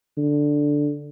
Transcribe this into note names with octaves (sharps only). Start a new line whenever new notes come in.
D3